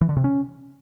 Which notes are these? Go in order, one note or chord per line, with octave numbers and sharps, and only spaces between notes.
E3
D3
C3
C#4